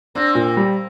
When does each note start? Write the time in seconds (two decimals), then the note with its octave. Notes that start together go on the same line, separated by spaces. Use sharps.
0.15 A#3 C4 D4
0.35 A#2
0.57 G3